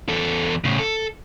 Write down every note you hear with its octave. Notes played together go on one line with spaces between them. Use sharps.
E2 A4
A2 C#3
A4